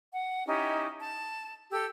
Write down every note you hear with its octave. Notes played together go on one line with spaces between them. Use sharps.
F#5
C#4 D#4 E4 G4
A5
G4 A4 E6